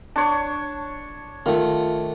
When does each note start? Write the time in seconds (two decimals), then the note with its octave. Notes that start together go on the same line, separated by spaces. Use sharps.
0.16 D4 C#5
1.46 D#3 A3 F4